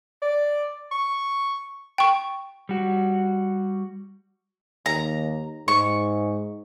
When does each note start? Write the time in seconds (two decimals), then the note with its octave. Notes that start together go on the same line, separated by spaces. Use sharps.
0.22 D5
0.92 C#6
1.98 G5 C#6
2.69 G3 F#4
4.86 D#2 A#5
5.68 G#2 C#6